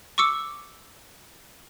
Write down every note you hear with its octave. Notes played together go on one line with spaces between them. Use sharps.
C#6 D6 E6 C#7